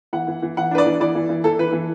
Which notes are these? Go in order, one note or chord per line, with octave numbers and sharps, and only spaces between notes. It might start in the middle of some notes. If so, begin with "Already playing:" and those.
E3 F#5
E3
E3
E3 F#5
D4 B4
D5
E3
E3 D5
E3
E3
E3 A4
E3 B4
E3